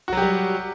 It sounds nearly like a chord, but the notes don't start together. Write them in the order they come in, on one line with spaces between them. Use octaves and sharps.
F#4 F#3 G4 G3